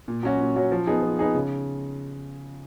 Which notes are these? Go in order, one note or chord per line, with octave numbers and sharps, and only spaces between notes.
A#2
F#3 C#4 F#4
A#2
F#3 C#4 F#4
F3
B3 D#4 G#4
F3
B3 D#4 G#4
C#3